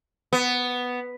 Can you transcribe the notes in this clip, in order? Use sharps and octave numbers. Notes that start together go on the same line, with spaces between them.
B3